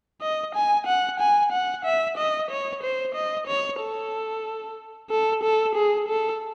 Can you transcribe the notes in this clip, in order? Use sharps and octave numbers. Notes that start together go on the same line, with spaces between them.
D#5
G#5
F#5
G#5
F#5
E5
D#5
C#5
C5
D#5
C#5
A4
A4
A4
G#4
A4